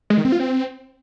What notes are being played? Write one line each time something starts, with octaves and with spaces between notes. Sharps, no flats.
G#3
D#3
C4
F4
C4